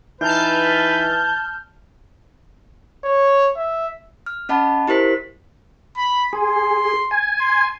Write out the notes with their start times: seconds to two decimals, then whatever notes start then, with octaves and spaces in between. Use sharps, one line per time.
0.21 E3 D#4 B4 A5 F6 G6
3.04 C#5
3.56 E5
4.26 F6
4.49 C#4 D#5 F#5 A5 B5
4.88 E4 G4 A#4 C5 B6
5.97 B5
6.33 G#4 C6
7.11 G#5
7.41 C6